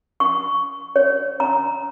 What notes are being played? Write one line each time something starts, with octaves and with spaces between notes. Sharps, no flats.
C#6
C#5
A#5